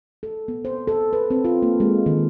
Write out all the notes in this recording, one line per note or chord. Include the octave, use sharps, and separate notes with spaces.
A4
B3
C5
A4
B4
C4
F4
A#3
G#3
D#3